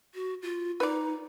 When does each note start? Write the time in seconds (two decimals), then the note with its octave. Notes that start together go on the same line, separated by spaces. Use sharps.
0.15 F#4
0.42 F4
0.80 D#4 B4 D5